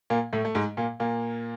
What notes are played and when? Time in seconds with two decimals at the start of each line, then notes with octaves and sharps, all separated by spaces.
0.10 A#2 A#3
0.33 A2 A3
0.45 A3
0.55 G#2 G#3
0.77 A#2 A#3
1.00 A#2 A#3